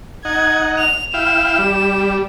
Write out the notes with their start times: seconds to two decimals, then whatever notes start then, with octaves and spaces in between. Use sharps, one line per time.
0.25 D#4 F#5 G#6
0.78 F7
1.14 E4 F5 G5 E7
1.59 G3